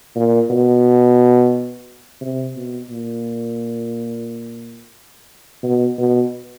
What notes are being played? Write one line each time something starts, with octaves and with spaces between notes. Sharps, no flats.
A#2
B2
C3
B2
A#2
B2
B2